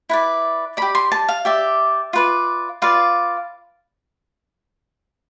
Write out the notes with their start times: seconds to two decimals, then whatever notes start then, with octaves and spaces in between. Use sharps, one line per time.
0.09 E4 B4 D5
0.77 G4 D5 B5
0.95 C6
1.12 A5
1.28 F5
1.45 G4 D5 E5
2.13 F4 B4 D5
2.82 F4 B4 D5 F5